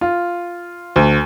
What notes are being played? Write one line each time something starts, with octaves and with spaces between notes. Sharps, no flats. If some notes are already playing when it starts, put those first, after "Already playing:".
F4
D2